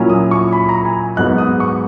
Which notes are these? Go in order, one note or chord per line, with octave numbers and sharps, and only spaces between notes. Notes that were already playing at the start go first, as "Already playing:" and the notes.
Already playing: A#2 F#3 A#3 C#4 E4
D#6
C#6
B5
A#5
G#5
G#2 F#3 B3 D#4 F#6
D#6
C#6